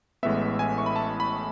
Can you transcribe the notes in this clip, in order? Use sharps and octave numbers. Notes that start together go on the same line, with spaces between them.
A1 A2 G#3 B3 E5
G#5
C#6
B5
A5
B5